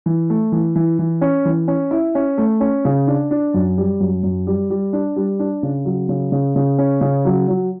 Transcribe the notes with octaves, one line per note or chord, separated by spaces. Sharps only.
E3
A3
E3
E3
E3
C#4
E3
C#4
E4
C#4
A3
C#4
C#3
D4
D4
F#2
G3
F#2
F#2
G3
G3
D4
G3
D4
C#3
F#3
C#3
C#3
C#3
C#4
C#3
F#3
F#3